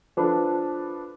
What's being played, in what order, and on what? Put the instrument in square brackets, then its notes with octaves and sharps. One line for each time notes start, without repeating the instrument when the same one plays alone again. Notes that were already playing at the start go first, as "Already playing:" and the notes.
[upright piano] F3 D4 A4 B4